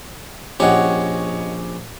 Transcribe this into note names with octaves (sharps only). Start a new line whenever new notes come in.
A#1 C#4 G4 C#5 D#5 F#5